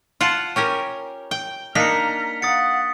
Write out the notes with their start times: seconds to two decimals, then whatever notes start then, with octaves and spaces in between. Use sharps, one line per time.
0.21 F4 F#5 A5
0.56 C#4 G4 A#4
1.31 G5 G7
1.75 A#3 D4 D#4 A#5 F6 B6 C#7
2.42 F5 F#5 D#6 A6 C#7